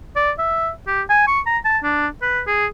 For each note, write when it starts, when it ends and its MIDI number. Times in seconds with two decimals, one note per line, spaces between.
0.16 0.31 74
0.39 0.69 76
0.87 1.02 67
1.10 1.26 80
1.27 1.40 85
1.46 1.58 82
1.65 1.78 81
1.83 2.07 62
2.22 2.41 71
2.47 2.67 68